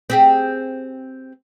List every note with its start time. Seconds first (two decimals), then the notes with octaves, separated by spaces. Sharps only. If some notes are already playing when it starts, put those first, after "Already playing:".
0.10 C4 G4 G#4